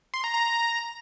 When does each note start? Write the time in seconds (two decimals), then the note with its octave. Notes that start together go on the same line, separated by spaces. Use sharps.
0.14 C6
0.24 A#5
0.34 A#5